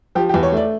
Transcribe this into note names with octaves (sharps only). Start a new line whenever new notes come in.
F3 G4
G4
E2
C#5
A3 D5